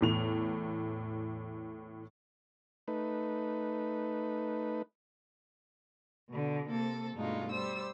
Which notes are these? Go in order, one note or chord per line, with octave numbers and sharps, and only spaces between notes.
E2 A2 F7
A3 D#4 B4
B2 D3
C3 A#3 A4
G2 B2 G#3 A3 D#4 F4
G3 C5 E6